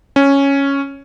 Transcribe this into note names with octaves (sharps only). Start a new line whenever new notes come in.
C#4